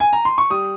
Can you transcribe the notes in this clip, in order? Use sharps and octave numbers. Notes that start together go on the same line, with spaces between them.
G#5
A#5
C6
C#6
G3 D#6